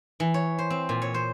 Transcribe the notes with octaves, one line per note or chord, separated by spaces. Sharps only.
E3
C#5
C5
C4
A#2
C#5
C5